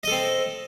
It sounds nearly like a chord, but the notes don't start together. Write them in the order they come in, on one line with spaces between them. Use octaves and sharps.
D#5 A4 C4